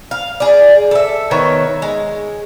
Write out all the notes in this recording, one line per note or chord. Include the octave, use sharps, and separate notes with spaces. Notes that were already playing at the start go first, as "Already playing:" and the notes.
F5
G#4 D5
A4 E5
D#3 B3 C#5 E5
G#3